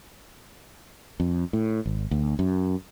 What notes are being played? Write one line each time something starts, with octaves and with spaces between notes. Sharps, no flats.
F2
A2
G#1
D2
F#2